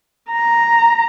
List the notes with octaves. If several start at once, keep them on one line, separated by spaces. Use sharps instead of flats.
A#5